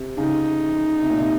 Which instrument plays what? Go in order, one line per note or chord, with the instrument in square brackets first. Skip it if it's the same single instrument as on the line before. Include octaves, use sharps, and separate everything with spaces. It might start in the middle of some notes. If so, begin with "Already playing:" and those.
Already playing: [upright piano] C3
[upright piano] C#3 [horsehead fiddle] D#4
[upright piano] C3
A#2
C3